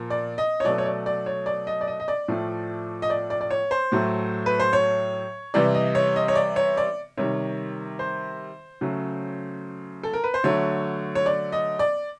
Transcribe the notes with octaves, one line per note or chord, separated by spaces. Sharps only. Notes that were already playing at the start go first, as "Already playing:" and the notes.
Already playing: A#2 F3
D5
D#5
C#5
B2 F#3 A3 D5
C#5
D5
D5
C#5
D5
D#5
D5
D#5
D#5
D5
A2 F3 A3
D#5
D5
D5
D5
C#5
C5
A2 F#3 A3
B4
C5
C#5
C3 E3 G3 D5
D#5
C#5
D#5
C#5
D5
C#5
D5
C3 D#3 G3 C#5
C5
C#3 F#3 A3
A4
A#4
B4
C5
D3 F#3 A3 C#5
C#5
D5
D#5
D5